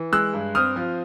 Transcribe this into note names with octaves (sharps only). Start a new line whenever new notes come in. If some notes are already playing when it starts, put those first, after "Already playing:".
Already playing: E3
G#3 E6 F#6
G2
C4 D#6 F6
F3